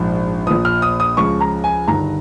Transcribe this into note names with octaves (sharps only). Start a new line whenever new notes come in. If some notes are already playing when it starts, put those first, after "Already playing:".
Already playing: A#1 G#2 F3
A#1 A#2 F3 D#6
F6
D#6
D#6
C#2 C#3 F3 C#6
A#5
G#5
G1 G2 D#3 A#5